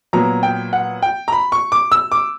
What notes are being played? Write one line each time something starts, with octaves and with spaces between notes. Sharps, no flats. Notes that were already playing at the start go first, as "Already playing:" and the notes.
A#2 F#3 B3 A#5
G5
F#5
G5
A#5
B5
C#6
D6
E6
D6